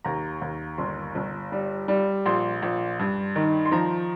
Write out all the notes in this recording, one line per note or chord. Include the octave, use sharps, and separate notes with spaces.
D#2 A#5
D#2
G1 C6
G1
G3
G3
A#1 C6
A#1
G2
D#3
C6
F3 A#5